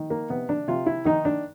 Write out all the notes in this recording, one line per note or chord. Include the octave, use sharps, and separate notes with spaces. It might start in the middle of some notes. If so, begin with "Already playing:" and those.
Already playing: D#3
A#3
C3 B3
D4
C3 F4
E4
D#3 D#4
D4